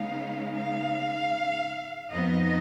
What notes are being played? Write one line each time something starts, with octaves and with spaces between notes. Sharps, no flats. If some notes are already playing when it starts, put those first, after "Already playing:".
Already playing: C#3 G#3 B3 D#4 F5
F5
F2 F3 B3 D#4 D#5